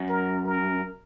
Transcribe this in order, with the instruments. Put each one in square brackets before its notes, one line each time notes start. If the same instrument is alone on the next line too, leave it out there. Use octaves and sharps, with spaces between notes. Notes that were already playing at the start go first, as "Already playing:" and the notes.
Already playing: [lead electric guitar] F#2
[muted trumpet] A#4
A#4